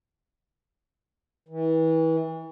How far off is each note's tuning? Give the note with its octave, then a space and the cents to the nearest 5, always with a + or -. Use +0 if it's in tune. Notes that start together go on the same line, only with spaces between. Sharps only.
E3 -30